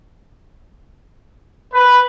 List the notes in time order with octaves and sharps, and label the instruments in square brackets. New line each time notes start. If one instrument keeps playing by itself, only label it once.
[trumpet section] B4